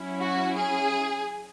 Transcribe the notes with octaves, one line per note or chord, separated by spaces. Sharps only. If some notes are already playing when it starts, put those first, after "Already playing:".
Already playing: F#3 C#4 E4
F#4
G#4